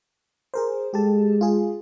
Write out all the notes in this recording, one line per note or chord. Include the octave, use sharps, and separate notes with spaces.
G#4 A#4 C5
G#3 G4 A4 A5
F4 G#4